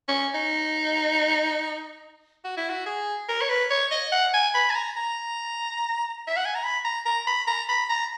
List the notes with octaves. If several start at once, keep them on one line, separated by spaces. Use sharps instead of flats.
C#4
D#4
F#4
E4
F#4
G#4
A#4
C#5
B4
C#5
D#5
F#5
G#5
B5
G#5
A#5
A#5
E5
F#5
G#5
A#5
B5
A#5
A#5
B5
A#5
B5
A#5